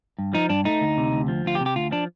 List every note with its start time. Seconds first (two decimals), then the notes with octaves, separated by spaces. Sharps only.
0.19 G2
0.33 F3 D#4
0.49 G2 D4
0.65 A3 D#4
0.81 D2
0.98 C3
1.12 D2
1.28 F3
1.45 D2 F4
1.55 G4
1.61 C3
1.66 G4
1.76 D2 F4
1.91 F3 D4